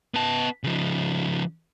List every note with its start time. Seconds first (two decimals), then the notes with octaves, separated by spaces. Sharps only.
0.14 B3 A5
0.64 C#3 F3